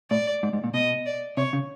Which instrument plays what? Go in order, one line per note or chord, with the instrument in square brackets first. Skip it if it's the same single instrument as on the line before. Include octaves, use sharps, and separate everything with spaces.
[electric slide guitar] A2 [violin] D5
[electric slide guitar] G#2
G#2
A#2
[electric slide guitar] B2 [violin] D#5
[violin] D5
[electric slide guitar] C3 [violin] C#5
[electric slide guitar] C#3